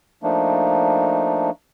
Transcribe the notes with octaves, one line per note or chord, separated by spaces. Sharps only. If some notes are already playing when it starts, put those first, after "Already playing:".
F3 A3 A#3 D4 D#4